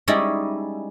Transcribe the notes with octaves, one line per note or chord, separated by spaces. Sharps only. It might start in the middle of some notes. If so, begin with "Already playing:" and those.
G3 G#3 C#4 D#4 E4 D5